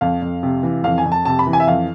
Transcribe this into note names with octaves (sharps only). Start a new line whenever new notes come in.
F2 F5
F2
C3
E3
F2 F5
G#5
F2
A5
C3 A5
B5
E3
G#5
E5
F2 F5